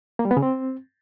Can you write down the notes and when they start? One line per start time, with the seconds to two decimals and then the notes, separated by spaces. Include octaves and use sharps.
0.19 A#3
0.25 G3
0.31 B3
0.37 C#3
0.42 C4